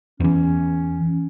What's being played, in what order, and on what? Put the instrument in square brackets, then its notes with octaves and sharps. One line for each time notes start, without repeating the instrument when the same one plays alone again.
[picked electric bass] E2 E3 [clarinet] C#4